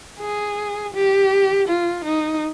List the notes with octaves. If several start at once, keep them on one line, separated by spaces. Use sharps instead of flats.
G#4
G4
F4
D#4